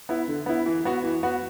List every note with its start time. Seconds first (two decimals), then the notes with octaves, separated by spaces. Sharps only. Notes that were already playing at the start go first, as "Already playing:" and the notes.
0.09 B3 E4
0.28 D3
0.46 B3 E4
0.66 E3
0.85 B3 F#4
1.04 E3
1.23 B3 F#4